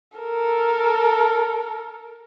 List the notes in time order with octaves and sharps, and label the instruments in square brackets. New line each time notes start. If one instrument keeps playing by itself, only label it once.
[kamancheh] A4 A#4